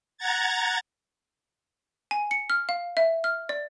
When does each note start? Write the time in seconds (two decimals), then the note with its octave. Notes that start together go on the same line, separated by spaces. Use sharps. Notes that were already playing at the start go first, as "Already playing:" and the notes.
0.18 F#5 A#5 G#6 A6
2.11 G#5
2.31 C#7
2.50 F6
2.69 F5
2.97 E5
3.24 F6
3.49 D5